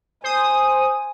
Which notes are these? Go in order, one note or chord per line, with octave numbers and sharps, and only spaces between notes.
C5 G#5 D#6